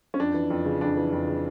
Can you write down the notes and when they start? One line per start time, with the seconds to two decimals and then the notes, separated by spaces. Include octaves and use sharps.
0.14 C#4
0.20 F2 D4
0.34 E3
0.50 F2
0.65 C#3
0.81 F2 D4
0.97 E3
1.12 F2
1.28 C#3